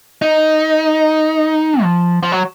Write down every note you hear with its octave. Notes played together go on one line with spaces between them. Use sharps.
D#4
F3
F3
F#3